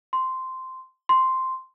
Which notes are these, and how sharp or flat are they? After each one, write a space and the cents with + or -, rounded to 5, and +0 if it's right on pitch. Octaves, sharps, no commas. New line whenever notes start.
C6 -10
C6 -5